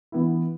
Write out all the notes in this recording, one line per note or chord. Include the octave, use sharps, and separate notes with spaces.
E3 B3 E4